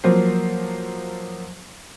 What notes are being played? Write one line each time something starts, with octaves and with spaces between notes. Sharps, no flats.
F3 F#3 A#3 C5